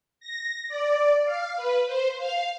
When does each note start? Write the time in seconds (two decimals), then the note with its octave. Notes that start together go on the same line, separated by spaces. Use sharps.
0.20 A#6
0.69 D5
1.24 F5
1.56 B4
1.86 C5
2.18 F5